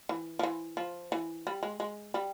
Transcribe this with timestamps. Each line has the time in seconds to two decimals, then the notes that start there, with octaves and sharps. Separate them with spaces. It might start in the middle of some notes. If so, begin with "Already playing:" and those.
0.09 E3
0.39 F3
0.43 E3
0.77 F3
1.12 E3
1.47 G3
1.63 G#3
1.80 G#3
2.14 G3